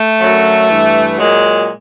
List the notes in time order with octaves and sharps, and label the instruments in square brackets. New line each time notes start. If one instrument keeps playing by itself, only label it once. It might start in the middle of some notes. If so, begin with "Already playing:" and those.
Already playing: [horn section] A3
F#2 D3 F#3
G2 E3
A#2 F#3 G#3